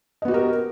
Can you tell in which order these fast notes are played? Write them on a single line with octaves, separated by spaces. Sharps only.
D#5 B3 F#4 G4 A#4